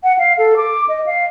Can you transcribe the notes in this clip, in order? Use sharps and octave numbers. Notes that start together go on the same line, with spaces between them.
F#5
F5
A4
D6
D#5
F5